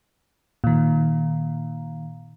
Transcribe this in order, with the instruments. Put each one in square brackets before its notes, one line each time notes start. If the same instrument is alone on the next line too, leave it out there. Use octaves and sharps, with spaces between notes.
[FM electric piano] A#2 D#3